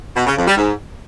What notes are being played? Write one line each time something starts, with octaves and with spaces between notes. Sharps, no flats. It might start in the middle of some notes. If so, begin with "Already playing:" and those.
B2
C#3
F2
G3
G#2